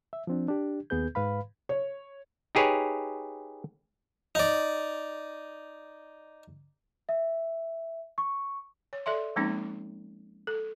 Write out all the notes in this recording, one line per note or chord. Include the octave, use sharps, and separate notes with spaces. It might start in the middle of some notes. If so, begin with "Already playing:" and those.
E5
F3 C4 D4
D4 G4
D#2 B3 G#4 B4 G6
G#2 B4 F5 B5
C#5
D#4 G4 G#4 B4 C#5
D#4 D5
E5
C#6
C#5
A4 D5 E5 C6
F3 G#3 A#3 C4 C#4 D#4
A4